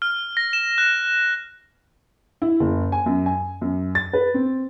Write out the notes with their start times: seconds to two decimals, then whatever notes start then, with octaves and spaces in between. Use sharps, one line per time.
0.02 F6
0.37 A#6
0.53 E7
0.78 F#6
2.42 E4
2.60 F#1
2.92 G#5
3.06 F#2
3.26 G#5
3.62 F#2
3.95 A6
4.13 B4
4.34 C4